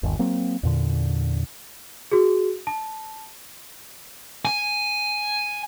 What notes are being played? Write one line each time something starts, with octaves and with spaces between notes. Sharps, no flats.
G1 D#2
F#3 A#3 C4
E2 A#2 D3
F#4 G#4
A5
G#5